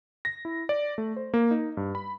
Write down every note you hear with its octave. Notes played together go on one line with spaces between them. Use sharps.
A#6
E4
D5
A3
C5
A#3
D#4
G2
B5